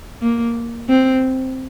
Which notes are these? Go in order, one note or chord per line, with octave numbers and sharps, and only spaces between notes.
A#3
C4